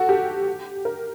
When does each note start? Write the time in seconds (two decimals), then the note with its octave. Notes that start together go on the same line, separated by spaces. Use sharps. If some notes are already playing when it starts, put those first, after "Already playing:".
Already playing: F#4 A4
0.09 G4
0.85 A#4